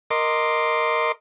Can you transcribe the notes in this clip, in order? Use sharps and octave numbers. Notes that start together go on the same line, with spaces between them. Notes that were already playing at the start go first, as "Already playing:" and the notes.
A#4 D#5 C6 D6